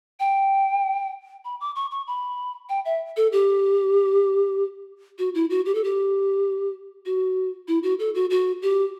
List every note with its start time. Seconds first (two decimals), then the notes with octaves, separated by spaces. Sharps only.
0.20 G5
1.45 B5
1.61 D6
1.76 C#6
1.91 C#6
2.07 B5
2.69 G5
2.85 E5
3.17 A4
3.32 G4
5.19 F#4
5.35 E4
5.50 F#4
5.66 G4
5.75 A4
5.84 G4
7.06 F#4
7.68 E4
7.83 F#4
7.99 A4
8.15 F#4
8.30 F#4
8.62 G4